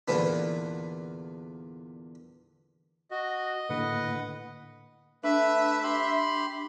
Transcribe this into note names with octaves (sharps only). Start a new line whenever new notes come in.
E2 A#2 D3 B3 D4
F#4 D#5
A2 D3 A#3 B4 F#5
A3 D4 B4 E5
G4 B5 C6